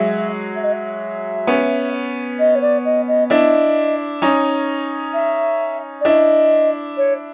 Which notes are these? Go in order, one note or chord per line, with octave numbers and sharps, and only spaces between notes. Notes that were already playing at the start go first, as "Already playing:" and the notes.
Already playing: F#3 G#3 E5
E5
D#5
E5
B3 C#4
D#5
C#5
D5
D#5
D#5
D4 E4 D#5
C#4 D#4
E5
D5
D4 E4 D#5
C#5